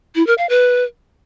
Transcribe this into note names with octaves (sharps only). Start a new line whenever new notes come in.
E4
A#4
F5
B4